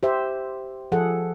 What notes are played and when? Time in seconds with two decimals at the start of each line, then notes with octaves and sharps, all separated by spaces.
0.03 G4 C5 E5
0.92 F3 G#4 A4 F#5